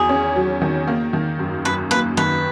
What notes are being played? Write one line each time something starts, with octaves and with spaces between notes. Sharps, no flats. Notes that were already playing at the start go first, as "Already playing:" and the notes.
Already playing: E2 D#3 F#3 G#4
C#4
F#3
D#3
A#3
D#3
F#2
F#2 B4
A#3 B4
D#3 B4